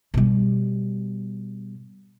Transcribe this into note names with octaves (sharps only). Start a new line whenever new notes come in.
B2 G3